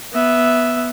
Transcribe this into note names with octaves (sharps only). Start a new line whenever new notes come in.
B3 E5